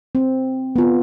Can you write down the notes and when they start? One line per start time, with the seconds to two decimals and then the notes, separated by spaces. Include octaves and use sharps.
0.15 C4
0.76 B3 F4